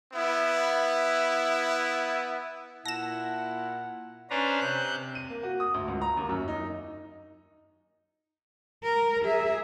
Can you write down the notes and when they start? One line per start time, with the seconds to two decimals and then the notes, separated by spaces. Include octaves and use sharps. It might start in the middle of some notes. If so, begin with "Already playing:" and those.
0.12 B3 E4
2.85 A#2 E4 F#5 A5 A#6 E7
4.30 C#4 D4 B4 C5 A#5
4.60 C3 F#6 G6
5.15 D#7
5.30 A#3
5.43 F#4
5.60 D#6
5.74 D2
5.88 C#2
6.02 A#5
6.17 D#2
6.29 F#2
6.48 D#4
8.83 A#4
9.25 G#4 E5